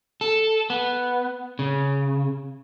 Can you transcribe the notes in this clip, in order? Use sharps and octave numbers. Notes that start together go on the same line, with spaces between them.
A4
B3
C#3